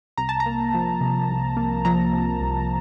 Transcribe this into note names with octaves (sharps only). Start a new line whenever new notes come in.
C2 A#5
A5
A#5
A#3
F3
C3
C2
A#3
F3 A#5
C3
C2